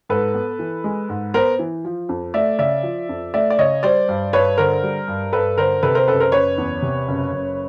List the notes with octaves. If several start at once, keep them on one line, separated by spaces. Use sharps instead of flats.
G#2 A4 B4
B3
E3
G#3
G#2
B3 A#4 C5
E3
F3
F2
A3 D5 E5
C#3 D5 E5
F3
F2
A3 D5 E5
D5
C#3 C#5 D#5
G3 C5 D5
G2
G2 B4 C#5
D3 A#4 C5
G3
G2
G2 A4 B4
D3 A#4 C5
C3 A4 B4
A#4 C5
F#1 A4 B4
A#4 C5
F#1 B4 C#5
E2
C3
F#1
F#1